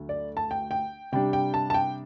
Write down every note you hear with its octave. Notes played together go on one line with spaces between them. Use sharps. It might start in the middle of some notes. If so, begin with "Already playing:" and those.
Already playing: D2 D3 F#3 A3
D5
A5
G5
G5
C3 G3 D4 G5
G5
A5
A5
G5